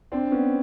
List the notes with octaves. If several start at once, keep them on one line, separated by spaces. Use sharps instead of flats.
C4 D4
B3 C#4